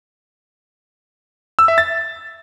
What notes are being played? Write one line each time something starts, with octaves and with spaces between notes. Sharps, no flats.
E6
E5
A6